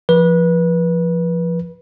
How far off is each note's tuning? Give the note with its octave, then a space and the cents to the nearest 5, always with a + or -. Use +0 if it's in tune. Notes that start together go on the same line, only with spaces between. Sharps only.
F3 -20 B4 -25